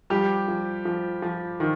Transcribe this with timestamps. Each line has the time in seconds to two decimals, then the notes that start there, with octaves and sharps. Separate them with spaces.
0.10 F3 G3 G4
0.48 F3
0.85 F3
1.22 F3
1.60 D#3 F3